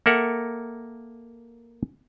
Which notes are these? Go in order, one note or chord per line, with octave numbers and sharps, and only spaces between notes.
A#3 A4 A#4 E5 F#5